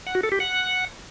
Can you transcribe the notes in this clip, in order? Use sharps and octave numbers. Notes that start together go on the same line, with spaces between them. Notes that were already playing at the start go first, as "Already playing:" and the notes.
F#5
F#4
A4
G4
F#5